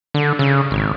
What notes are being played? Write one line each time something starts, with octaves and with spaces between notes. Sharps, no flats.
D3
C#3
G#1